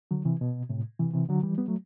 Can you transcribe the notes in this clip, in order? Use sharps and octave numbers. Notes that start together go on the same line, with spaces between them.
D3 F#3
C3 E3
B2
A2 C3
C3 E3
C3 E3
D3 F#3
E3 G3
G3 B3
F#3 A3